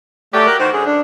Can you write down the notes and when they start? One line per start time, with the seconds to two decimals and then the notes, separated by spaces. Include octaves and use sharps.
0.34 F#3 A3 G4 A4 D5
0.46 A#4 F#6
0.60 D#3 E3 F#4 C5
0.73 F#2 D3 G#4
0.86 D4